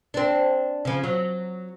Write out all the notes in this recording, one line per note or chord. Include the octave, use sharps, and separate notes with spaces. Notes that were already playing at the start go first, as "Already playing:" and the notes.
C4 D4
C#3 F3
F#3